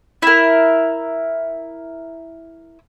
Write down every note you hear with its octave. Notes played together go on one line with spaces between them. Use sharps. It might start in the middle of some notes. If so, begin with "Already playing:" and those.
E4 A#4